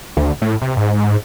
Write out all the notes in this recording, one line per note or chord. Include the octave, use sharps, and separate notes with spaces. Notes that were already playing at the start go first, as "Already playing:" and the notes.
D2
A2
C3
G#2